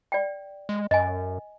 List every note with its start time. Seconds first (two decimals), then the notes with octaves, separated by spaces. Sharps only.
0.12 D5 G5
0.69 G#3
0.91 F#2 D#5 G#5